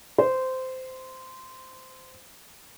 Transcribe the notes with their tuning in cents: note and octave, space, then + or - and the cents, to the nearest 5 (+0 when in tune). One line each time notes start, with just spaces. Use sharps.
C5 -15